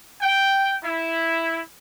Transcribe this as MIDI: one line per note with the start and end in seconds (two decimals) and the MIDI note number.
0.22 0.75 79
0.84 1.60 64